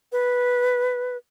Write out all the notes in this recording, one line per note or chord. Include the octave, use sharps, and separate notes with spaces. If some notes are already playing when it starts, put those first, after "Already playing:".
B4